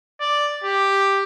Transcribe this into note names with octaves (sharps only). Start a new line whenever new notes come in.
D5
G4